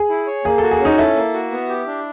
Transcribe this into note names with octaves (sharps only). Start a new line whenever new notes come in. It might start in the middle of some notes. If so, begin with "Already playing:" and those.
Already playing: G#4
E4
C#5
A#3 G#4
F#4 A4
G#4
C#4 D#4
E4 A4
A#3
F#4
B3
G4
D4